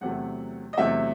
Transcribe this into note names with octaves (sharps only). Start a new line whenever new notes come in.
E2 C3 F#3 A3 F#5
D#5
E2 C3 F#3 A3 E5